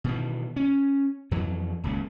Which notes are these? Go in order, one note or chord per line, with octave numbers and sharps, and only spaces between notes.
B2 D#3 E3
C#4
F2 E3 F#3
D#1 C#2 C#3